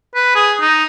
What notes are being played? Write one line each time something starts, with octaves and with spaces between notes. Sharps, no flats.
B4
G#4
D#4